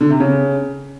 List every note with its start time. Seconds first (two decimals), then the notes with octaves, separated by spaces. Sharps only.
0.01 D3
0.10 C3
0.20 C#3